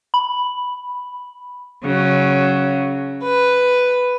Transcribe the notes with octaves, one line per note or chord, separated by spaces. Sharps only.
B5
C#3 F#3
B4